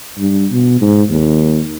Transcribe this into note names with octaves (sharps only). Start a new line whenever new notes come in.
G2
B2
G#2
D#2